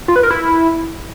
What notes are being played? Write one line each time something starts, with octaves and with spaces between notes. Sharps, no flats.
F4
B4
A#4
E4